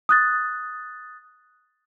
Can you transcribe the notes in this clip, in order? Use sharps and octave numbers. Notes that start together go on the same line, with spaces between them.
D#6 F#6 A6